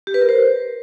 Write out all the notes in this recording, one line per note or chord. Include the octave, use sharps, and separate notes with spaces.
G4
B4
A#4
C5